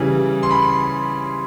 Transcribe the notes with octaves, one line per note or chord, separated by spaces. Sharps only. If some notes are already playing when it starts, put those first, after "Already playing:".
Already playing: C#3 E3 G3
C6
B5